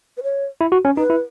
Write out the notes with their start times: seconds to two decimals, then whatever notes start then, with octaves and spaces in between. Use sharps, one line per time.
0.17 B4
0.23 C#5
0.61 E4
0.72 F#4
0.85 C#4
0.97 D#4 B4
1.10 E4